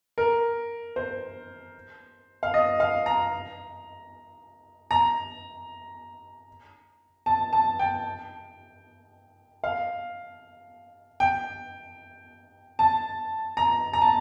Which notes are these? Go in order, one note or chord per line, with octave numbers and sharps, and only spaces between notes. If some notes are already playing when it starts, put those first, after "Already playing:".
A#4
C5
F5
D#5
F5
A#5
A#5
A5
A5
G5
F5
G5
A5
A#5
A#5
A5